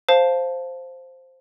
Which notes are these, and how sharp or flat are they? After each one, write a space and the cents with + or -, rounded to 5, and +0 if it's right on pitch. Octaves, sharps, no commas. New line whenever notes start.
C5 +0 F5 +0 A5 +0